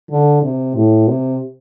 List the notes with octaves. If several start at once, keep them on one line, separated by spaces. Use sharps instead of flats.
D3
C3
A2
C3